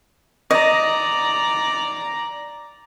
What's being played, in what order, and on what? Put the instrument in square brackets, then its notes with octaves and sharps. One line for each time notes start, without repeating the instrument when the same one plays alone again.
[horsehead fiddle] D5 A#5 [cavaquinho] D#5